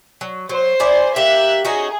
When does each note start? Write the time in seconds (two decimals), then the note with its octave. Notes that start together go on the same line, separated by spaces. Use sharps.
0.21 F#3
0.49 F#3 C5
0.80 E4 G#4 D5
1.16 A#3 G4 E5 F#6
1.65 C#4 D#4 F#4 G#4